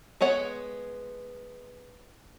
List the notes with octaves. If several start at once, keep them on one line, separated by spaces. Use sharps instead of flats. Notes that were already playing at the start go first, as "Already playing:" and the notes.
G#3 B3 C#5 F#5